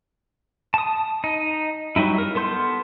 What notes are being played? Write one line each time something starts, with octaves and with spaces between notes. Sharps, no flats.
A5 D#6
D#4
F#3 G3 D#4 E4
A#4
B3 A4 C6 G6